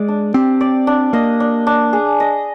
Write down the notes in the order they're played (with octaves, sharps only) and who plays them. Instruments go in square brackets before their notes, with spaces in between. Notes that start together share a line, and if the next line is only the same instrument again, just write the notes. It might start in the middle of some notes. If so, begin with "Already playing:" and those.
Already playing: [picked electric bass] G#3 [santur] D5
[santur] D4
[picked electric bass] C4 [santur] G4
[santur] D5
D4
[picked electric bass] A#3 [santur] D#5
[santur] D4
D4
G#4
D#5